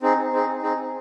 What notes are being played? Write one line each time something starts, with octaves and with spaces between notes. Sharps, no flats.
C4 D#4 G#4
C4 D#4 G#4
C4 D#4 G#4